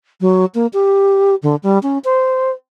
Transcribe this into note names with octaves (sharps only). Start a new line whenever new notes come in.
F#3
A#3
G4
D3
G3
C#4
C5